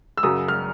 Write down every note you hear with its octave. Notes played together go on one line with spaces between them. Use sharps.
E6
F#2 C#3 F#3 D#6
F6